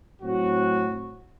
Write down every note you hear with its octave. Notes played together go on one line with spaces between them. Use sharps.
A2 F#3 C4 F#4